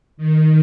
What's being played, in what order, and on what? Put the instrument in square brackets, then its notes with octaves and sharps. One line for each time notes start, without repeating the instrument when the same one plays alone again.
[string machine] D#3